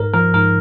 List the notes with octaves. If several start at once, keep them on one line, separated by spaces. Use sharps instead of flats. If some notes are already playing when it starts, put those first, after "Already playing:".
Already playing: G#2 A#4
F3 A#4
G#2 A#4